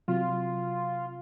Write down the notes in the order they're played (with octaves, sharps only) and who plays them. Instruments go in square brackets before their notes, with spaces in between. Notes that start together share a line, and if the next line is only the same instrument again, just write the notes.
[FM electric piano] C3 F#3 [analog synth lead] F4